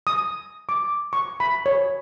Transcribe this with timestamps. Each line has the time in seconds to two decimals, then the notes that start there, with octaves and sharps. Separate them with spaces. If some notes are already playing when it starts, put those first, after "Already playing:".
0.07 D#6
0.69 D6
1.13 C#6
1.40 B5
1.66 C#5